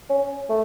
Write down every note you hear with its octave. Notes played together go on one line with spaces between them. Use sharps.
C#4
A3